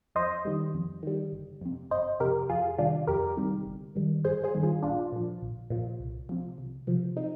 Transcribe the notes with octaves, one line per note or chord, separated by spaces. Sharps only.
F2 C5 D#5
D#3 G3
F2
D#3 G3
G1
F2 C3
G1 C5 D#5
F2 C3 G4 A#4
F2 F4 G#4
C3 D#3 G3 D4 F4
F2 G4 A#4
C3 D#3 G3
G1
G2 D#3 G3
G1 G#4 C5
G#4 C5
G2 D#3 G3
F4 G#4
A#1 D4 F4
A#2 F3
A#1
A#2 F3
C2
C3 F3
C2
C3 F3
C4 D#4